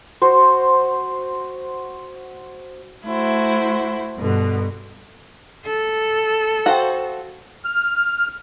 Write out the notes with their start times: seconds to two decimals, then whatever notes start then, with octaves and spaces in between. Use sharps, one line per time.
0.22 F#4 C5
3.06 A3 E4 F#4 C5
4.17 G2 B2 D3
5.65 A4
6.66 F#4 C5 F5 G5
7.65 F6